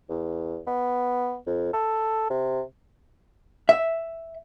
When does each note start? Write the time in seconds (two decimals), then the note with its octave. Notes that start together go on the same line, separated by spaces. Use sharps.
0.10 E2
0.67 B3
1.47 F2
1.73 A4
2.30 C3
3.69 E5